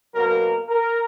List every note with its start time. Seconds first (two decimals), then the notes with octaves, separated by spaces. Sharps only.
0.14 B2 F#3 A#3 A#4
0.69 A#4